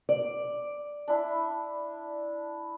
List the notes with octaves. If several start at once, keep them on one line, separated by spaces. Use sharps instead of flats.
D5
D4 E4